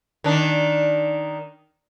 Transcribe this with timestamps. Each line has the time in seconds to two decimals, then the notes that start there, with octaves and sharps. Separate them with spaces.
0.24 D#3 D4